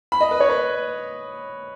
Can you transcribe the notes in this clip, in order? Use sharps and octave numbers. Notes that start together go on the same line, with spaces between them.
B5
D#5
B4
C#5
B4